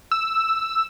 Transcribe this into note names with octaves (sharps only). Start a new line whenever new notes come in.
E6